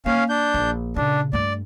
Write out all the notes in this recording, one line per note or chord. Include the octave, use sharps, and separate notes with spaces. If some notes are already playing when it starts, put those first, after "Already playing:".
A#3 C#4 F5
D4 G6
A#1
A#2 C#3 D4
G2 A3 D5